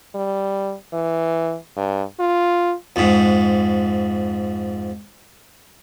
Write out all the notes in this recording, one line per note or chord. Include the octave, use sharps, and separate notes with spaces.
G3
E3
G2
F4
F2 G#2